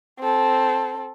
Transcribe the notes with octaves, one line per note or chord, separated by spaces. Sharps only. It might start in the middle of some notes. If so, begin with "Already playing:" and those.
C4 A4